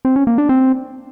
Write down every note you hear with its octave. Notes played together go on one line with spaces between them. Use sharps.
C4
C#4
A#3
D4
C4